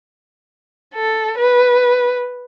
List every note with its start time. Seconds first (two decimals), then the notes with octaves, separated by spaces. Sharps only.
0.95 A4
1.37 B4